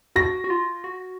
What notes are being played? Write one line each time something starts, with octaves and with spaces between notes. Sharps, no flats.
F#4 A#6
F#4
F4
F#4